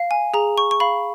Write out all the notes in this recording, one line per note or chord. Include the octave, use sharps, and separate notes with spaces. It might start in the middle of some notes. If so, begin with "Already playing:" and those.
Already playing: F5
G#5
G#4 A#5
C#6
C#6
F5 B5